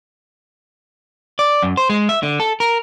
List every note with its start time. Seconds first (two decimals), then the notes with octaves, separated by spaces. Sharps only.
1.39 D5
1.63 F#2
1.77 C5
1.90 G#3
2.09 E5
2.23 D3
2.40 A4
2.60 A#4